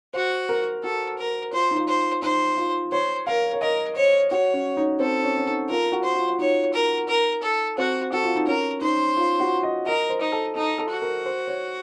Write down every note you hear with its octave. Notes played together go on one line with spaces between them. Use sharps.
F#4 C5
A#4
F#4 A4
A#4
F4 C5
D#4
F4
C5
D#4 C5
F4
C5 C#5
A#4 F5
C#5
A#4 D#5
C5 C#5
F#4 C#5
C#4
D#4
C4 A4
C#4
C#4
D#4
F4 A#4
F#4
C5
F4
F4
D#4 C#5
A#4
A#4
A4
C4 F#4
F#4 A4
F4
D#4
C#4 A#4
D#4 C5
F4
F#4
D#5
A#4 D#5
C5
D#4
A4
D#4 A4
A4
F#4
A#4
C5
C#5